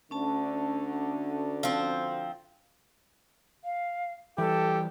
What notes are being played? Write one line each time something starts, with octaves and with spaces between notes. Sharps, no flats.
D2 D3 C#4 A5
F3 C4
F5
E3 G3 G4 A4